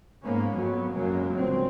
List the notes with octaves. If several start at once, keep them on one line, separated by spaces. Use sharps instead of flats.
G#2 A#3 B3 C#4
F2 F#3 B3
F#2 C#3 F#3 G#3 A#3
G1 A#2 C4